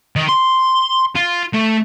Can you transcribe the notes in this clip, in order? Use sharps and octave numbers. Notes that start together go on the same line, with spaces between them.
D#3
C6
F4
A3